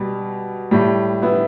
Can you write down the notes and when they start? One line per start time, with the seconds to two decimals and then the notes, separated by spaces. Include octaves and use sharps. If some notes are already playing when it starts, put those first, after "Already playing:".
Already playing: B2 G3
0.71 A2 G3
1.22 B3 E4